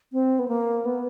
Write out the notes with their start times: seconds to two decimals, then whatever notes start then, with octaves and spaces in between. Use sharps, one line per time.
0.13 C4
0.39 B3
0.48 A#3
0.85 B3